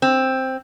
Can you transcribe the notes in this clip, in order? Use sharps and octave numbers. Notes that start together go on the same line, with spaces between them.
C4